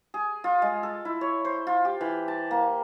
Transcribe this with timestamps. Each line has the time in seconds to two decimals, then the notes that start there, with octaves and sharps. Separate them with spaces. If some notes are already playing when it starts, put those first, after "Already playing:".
0.14 G#4
0.44 F4
0.62 G#3
0.83 A4
1.05 E4
1.21 C#5
1.45 C5
1.67 F4
1.85 G4
2.01 E3
2.28 A5
2.51 A#3